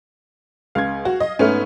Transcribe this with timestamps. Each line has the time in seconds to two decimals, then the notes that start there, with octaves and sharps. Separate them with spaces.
0.75 C#2 F5 G#6
1.05 F#4
1.20 D#5
1.39 G#2 A3 B3 C#4 F6